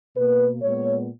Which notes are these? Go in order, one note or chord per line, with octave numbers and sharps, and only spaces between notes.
B2 A#3 B4
A#2 G#3 B3 C#5